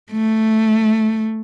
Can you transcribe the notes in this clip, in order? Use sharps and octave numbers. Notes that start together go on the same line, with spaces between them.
A3